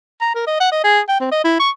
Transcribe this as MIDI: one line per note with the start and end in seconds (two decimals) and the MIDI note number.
0.21 0.32 82
0.35 0.43 70
0.47 0.56 75
0.60 0.69 78
0.72 0.81 75
0.84 1.00 68
1.09 1.19 79
1.20 1.29 60
1.32 1.41 75
1.44 1.55 64
1.59 1.70 85